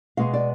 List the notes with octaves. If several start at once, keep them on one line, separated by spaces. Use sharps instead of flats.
B2 G#3 B3 F5
D5